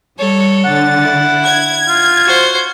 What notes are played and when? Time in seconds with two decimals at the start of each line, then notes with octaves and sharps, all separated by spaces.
0.18 G3 A4 C#5
0.65 D3 F#5 A6
1.02 E4
1.44 G#6
1.88 F4
2.25 F#4 C5